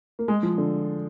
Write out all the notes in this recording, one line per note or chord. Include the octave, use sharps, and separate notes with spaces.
A#3
G#3
F3
D3